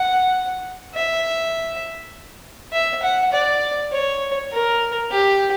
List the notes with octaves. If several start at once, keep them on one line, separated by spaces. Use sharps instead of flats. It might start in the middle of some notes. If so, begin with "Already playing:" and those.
Already playing: F#5
E5
E5
F#5
D5
C#5
A#4
G4